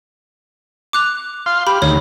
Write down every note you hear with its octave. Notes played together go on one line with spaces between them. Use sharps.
D6 F#6 F7
F5 C6
G4 B5
D2 D#3 C#5